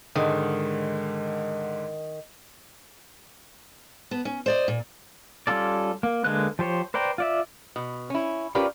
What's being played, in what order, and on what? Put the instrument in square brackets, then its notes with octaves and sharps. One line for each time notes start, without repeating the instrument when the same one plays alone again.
[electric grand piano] G#2 D3 G#3 [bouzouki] D#3
[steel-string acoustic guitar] B3 A5
C#4
C5 D5 D#5
A#2
[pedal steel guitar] G3 C#4 F4 A4 D5
A#3
D3 G#3 A#3 B4 F#6
F3 G4 C5 C#5
B4 C5 D5 G5 A#5
F4 D5 E5
[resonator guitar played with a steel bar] B2
C#4 E4
C#4 F4 G4 A#4 B4 D5